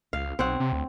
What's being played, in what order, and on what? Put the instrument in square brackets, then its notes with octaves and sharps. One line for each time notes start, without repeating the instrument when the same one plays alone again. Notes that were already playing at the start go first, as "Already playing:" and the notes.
[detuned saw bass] C#2 [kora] F5
[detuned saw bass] B1 [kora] C4 C#5 F#5
[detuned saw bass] C3
D2